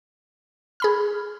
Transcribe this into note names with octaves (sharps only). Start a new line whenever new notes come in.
G#4 B5 F6